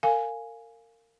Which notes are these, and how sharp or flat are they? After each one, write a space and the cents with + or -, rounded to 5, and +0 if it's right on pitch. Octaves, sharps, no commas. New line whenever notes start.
A#4 -30 F5 +0 G#5 +0